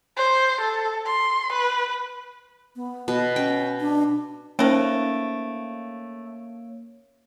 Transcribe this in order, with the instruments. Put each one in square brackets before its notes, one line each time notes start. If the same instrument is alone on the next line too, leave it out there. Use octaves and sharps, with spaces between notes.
[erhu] C5
A4
C6
B4
[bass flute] B3
[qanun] B2
[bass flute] C#4 [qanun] G5
[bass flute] D4
[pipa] A3 A#4 [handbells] A#3 C#5 D7 [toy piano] C#4 D#4 C5